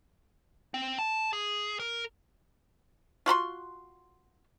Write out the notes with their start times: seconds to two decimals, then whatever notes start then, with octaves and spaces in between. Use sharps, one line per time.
0.74 C4
0.99 A5
1.33 G#4
1.80 A#4
3.26 F4 F#4 B5 C6